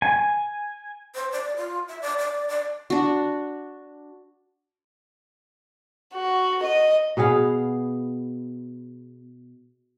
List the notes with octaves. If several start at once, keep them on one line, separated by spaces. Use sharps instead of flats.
G#5
C5
D5
F4
E5
D5
D5
D5
D4 F#4
F#4
D#5
B2 B3 G#4 F5